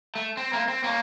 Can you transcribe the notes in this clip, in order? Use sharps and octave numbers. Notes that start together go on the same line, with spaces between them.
A3
C4
A3 A#3
C4
A#3 C#4